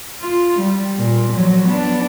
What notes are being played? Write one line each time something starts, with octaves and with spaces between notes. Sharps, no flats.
F4
G3
A#2
F3 F#3
B3 D4